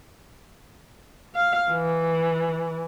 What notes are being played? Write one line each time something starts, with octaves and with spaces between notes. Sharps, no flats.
F5
E3